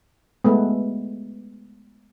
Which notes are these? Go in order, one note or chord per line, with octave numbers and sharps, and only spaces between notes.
G#3 A3 B3